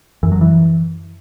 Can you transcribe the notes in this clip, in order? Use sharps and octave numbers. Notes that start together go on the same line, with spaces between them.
F#2 E3
F#3
E3